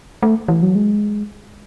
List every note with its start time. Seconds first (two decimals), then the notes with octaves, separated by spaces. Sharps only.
0.23 A3
0.48 E3
0.63 F#3
0.75 G#3